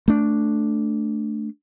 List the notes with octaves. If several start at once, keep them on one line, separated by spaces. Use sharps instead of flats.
A3 D4